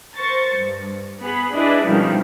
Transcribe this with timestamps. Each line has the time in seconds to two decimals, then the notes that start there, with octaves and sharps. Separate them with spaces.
0.16 A#4 C5 C#6 A6
0.54 G2
1.21 B3 G#4 B5
1.54 D4 E4 G#4 B4 D5 D#5
1.88 C#2 G2 B2 D#3 F3 G3